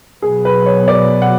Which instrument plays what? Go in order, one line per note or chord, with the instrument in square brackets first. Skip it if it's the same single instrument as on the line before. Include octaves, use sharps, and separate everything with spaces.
[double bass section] B2 F#3 B3 [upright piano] G#4
[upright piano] B4
C#5
D5
F#5